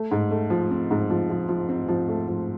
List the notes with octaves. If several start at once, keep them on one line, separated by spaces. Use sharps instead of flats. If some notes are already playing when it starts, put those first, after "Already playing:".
Already playing: A3
G#2
A3
F3
C4
G#2
F3
F3
F3
C4
F3
A3
F3